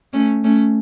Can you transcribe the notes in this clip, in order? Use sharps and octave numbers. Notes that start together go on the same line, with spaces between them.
A3 C#4
A3 C#4